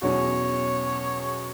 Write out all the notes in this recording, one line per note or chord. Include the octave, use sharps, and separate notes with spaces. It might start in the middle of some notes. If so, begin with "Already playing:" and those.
E2 B2 F#3 C#4 G#4 C#5